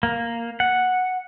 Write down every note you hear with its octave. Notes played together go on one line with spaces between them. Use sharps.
A#3
F#5